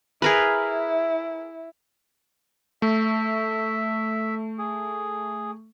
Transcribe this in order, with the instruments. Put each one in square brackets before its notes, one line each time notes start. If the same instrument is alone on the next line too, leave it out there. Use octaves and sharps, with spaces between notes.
[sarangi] E4 [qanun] G#4 A#4 B4
[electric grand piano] A3 [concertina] E5
[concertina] G#4